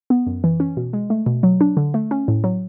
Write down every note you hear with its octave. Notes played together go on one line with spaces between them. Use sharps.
B3
F#2
E3
C#4
B2
G#3
A3
B2
F#3
D4
D3
A3
C#4
A2
F#3